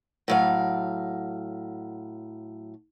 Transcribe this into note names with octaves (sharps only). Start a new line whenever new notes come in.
A2 F#3 F5